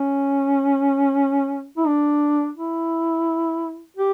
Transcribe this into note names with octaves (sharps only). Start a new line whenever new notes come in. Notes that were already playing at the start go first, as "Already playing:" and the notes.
Already playing: C#4
E4
D4
E4
G4